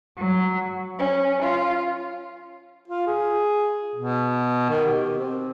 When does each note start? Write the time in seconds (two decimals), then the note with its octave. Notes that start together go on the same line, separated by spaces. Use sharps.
0.17 F#3
0.98 C#4
1.41 F4
2.88 F4
3.07 G#4
3.96 B2
4.70 D#3
4.85 G4
5.18 C4